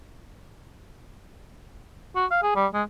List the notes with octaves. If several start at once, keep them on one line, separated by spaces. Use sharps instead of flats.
F#4
F5
G#4
G3
G#3